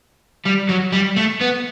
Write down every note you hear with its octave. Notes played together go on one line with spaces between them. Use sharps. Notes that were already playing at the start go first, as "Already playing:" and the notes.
G3
F#3
G3
A3
B3